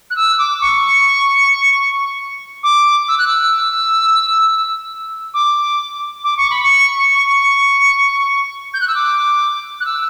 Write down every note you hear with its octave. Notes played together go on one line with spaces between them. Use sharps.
F#6
E6
D6
C#6
D6
E6
F#6
E6
D6
D6
C#6
B5
C#6
C#6
G6
F#6
E6
D6
F#6
E6